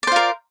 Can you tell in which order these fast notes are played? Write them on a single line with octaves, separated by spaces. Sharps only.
D5 C5 F4 A#4